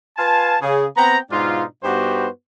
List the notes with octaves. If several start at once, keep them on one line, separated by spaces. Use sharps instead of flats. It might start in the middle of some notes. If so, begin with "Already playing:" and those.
F4 B4 F5 G#5 A5
C#3 G#4
B3 C4 G5 A#5
G#2 B2 D4 D#4 F4
G2 B3 D#4 F#4 G4 C5